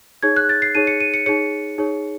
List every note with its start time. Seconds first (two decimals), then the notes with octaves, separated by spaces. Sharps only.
0.23 D#4 G#4 C#5 G#6
0.37 F#6
0.49 A6
0.62 C7
0.75 D#4 G#4 C#5 D#7
0.87 C#7
1.00 D#7
1.14 C#7
1.26 D#4 G#4 C#5 C#7
1.78 D#4 G#4 C#5